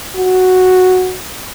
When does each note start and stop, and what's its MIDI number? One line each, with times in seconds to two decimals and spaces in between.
0.17 1.18 66